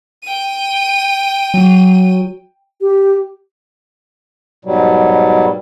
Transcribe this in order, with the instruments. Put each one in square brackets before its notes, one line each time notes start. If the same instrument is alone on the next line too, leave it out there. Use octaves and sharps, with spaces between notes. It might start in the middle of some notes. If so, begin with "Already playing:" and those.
[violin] G5 D#7
[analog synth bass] F#3
[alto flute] G4
[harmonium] G#2 B2 F#3 G3